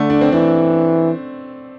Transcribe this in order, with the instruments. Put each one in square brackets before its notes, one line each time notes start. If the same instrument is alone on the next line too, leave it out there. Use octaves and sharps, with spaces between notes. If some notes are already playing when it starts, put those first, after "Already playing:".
Already playing: [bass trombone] D3 [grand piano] A3
[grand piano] D4
C4
[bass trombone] E3 [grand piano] D4